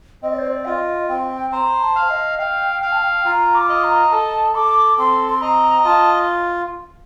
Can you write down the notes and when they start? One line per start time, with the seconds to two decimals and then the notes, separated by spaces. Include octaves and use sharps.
0.22 C4 D#5
0.31 D5
0.38 C5
0.47 D5
0.65 F4 D#5 G5
1.09 C4 G5
1.52 C5 A#5
1.81 A5
1.96 F5
2.09 D#5
2.39 F5 G5
2.81 F5 G5
2.92 A5
3.02 G5
3.25 F4 A#5
3.55 D6
3.69 D#5
3.84 A#5
4.12 A4 A5
4.55 A4 D6
4.98 C4 C6
5.30 C6
5.41 D#5 A#5
5.85 F4 A5